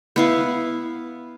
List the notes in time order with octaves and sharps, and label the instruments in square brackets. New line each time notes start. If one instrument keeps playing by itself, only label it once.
[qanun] B3 E4 F5